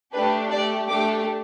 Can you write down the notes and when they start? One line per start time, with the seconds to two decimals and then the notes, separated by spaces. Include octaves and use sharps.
0.13 A3 D4 G4 B4
0.51 A3 G4 D5
0.88 A3 D4 G4 D6